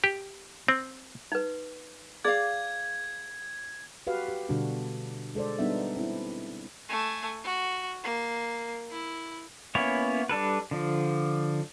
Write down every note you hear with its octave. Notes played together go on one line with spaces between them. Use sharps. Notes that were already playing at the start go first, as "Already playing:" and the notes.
G4
C4
D#4 B4
G#4 D5 F5 G#6
F#4 G4 B4 F5
G4
B2 D3 G3 D4 F#4
G#3 A4 C5 D5
G3 B3 D4 D#4 E5
C4 E4
A3 G#5
F#4
A#3
E4
A#3 B3 C#4 E4 C#5
G3 D4 A4 B4
D3 F3